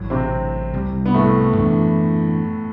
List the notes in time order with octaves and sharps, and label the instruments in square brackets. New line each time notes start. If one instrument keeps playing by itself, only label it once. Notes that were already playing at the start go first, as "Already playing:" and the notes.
Already playing: [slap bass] A1 A2 F#3
[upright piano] C3 C4
[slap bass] C2 C3 G3
[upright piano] B3
A2 A3
[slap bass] F#2 E3 B3 D4